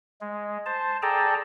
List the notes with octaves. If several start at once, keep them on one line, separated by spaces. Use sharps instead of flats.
G#3
C5 A5
G#4 A4 D5 G5 A5 A#5